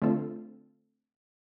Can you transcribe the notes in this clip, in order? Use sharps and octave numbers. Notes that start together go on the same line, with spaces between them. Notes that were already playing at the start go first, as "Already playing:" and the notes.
D3 A3 C4 F4 A4